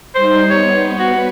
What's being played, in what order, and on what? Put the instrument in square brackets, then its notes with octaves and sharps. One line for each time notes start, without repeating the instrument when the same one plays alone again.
[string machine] G3 D#4 [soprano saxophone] C5
[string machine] B3 [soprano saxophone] C#5
[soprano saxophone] F#4 [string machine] B4